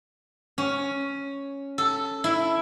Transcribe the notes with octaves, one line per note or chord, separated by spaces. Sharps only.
C#4
A4
E4